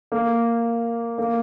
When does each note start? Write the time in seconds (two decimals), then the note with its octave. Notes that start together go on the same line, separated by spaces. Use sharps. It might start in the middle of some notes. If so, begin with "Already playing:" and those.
0.12 A#3
1.18 A#3